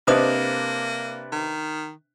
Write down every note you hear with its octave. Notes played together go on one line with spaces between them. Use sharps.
C3 A#3 D4 B4 C5 D#5 D#6
D#3